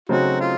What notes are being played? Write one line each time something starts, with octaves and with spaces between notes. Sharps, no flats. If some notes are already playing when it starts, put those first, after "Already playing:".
C#3 F#3 A3 C4 D#4 F#4
F4